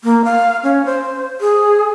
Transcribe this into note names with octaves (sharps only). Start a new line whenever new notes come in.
A#3
F5
C#4
C5
G#4